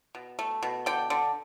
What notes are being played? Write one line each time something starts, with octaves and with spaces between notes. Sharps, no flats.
B2
A3
B2
D3 G5
D3